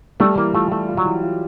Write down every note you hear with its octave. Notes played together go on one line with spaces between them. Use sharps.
G3 A3
E3 A#3
A3 F4
A3 F4
F4
F#3
E3
F4